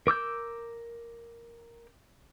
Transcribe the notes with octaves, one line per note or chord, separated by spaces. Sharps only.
A#4 D6 E6 G6